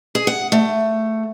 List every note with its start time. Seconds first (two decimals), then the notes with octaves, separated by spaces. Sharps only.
0.15 G#4
0.27 F#5
0.52 A3